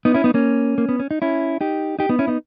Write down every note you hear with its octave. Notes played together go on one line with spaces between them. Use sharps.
B3 D#4
C#4 E4
B3 D#4
A#3 C#4
A#3
B3
C#4
D#4
C#4 E4
D#4 G4
D#4 G4
B3 D#4
C#4 E4
B3 D#4